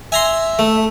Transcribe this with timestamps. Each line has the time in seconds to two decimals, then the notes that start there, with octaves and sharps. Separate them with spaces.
0.12 E5 G#5 A#5 C6
0.59 A3